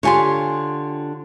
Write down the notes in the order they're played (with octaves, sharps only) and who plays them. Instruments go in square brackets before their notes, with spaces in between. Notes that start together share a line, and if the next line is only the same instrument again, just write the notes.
[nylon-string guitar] D3 F4 G4 [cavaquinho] C#5 G#5 C6